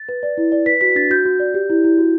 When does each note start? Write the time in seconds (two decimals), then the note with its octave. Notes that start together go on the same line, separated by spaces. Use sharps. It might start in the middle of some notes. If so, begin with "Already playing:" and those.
Already playing: A6
0.09 B4
0.23 D5
0.37 E4
0.52 D5
0.66 B4 B6
0.81 F#4 B6
0.95 D4 A6
1.10 F#4 G6
1.25 F#4
1.40 D5
1.54 G4
1.70 E4
1.84 E4
1.98 F#4